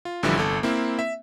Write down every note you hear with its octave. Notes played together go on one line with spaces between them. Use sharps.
F4
A1 D3 E3 F3 G3 E4
G1 C2 A4
A#3 C4 E4
E5